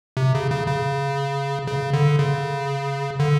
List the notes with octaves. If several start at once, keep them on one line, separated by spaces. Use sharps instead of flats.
C3
C#3
C#3
C#3
C#3
D3
C#3
D3